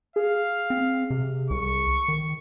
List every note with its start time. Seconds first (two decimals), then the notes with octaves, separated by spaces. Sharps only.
0.16 G#4 F5
0.70 C4
1.10 C3
1.50 C2 C#6
2.08 D#3